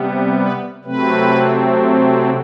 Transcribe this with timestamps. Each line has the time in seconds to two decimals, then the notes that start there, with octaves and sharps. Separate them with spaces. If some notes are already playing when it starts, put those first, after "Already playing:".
Already playing: C3 G3 B3
0.39 B4
0.84 C3 F#3 A3 C4 B4